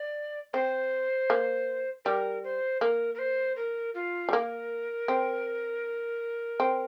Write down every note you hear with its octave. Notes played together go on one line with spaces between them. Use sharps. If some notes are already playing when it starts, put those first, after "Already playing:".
Already playing: D5
C4 C5
A#3
G3 A#4
C5
A#3 A#4
A#4
C5
A#4
F4
G3
A#3 A#4
C4
C4